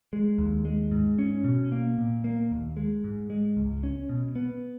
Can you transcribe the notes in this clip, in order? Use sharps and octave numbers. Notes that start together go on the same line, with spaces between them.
G#3
D#2
G#3
G#2
C#4
B2
A#3
A#2
A#3
D#2
G#3
G#2
G#3
C#2
C#4
B2
B3